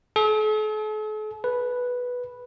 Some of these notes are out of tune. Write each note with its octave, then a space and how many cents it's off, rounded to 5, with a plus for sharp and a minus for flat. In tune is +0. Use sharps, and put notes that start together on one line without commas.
A4 -45
B4 -5